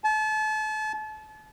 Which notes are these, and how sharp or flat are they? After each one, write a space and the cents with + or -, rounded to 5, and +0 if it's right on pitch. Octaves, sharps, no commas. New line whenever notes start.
A5 -35